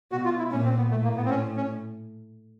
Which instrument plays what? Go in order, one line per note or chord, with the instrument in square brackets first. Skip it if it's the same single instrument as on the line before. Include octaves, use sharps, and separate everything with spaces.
[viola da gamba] B2 [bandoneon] F#4
[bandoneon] F4
E4
[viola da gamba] A#2 [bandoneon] C#4
[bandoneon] C4
B3
[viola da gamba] A2 [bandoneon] A3
[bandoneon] A#3
B3
C4
C#4
C#4